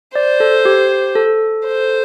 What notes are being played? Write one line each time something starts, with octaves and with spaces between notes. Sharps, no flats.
C5 D5
A4
G4
A4
C5